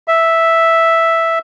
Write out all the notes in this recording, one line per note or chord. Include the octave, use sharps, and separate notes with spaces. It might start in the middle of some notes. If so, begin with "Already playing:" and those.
E5